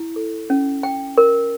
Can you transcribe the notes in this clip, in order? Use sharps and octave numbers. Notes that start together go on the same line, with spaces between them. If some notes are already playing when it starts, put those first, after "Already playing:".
Already playing: E4
A4
C#4
G5
A#4